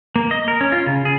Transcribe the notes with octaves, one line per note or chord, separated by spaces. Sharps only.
A#3
D#5
A#4
C#4
F4
C#3
G#4